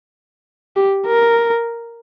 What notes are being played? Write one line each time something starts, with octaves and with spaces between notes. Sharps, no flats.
G4
A#4